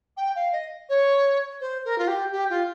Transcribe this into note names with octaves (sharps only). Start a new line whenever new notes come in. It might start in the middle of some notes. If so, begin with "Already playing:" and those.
G5
F5
D#5
C#5
C5
A#4
F4
G4
G4
F4